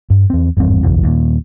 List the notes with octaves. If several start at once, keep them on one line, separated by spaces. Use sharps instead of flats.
G2
E2 C4
G#1 E2 G2 C4
F#1 B1 E2 E3
D#2 A#2